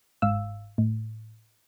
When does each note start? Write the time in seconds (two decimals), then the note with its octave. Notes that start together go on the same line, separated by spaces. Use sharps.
0.22 G1 G#2 F5 E6
0.78 A2